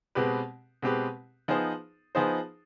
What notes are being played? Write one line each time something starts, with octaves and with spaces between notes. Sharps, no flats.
B2 G#3 C4 G4 B4
B2 G#3 C4 G4 B4
F3 B3 D#4 G#4 C5
F3 B3 D#4 G#4 C5